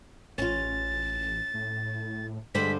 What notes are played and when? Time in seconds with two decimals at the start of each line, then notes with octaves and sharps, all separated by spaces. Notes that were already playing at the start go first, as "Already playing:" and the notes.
0.38 A1 C#4 F4 A6
1.54 A2
2.55 G2 D3 G#3 C5 B6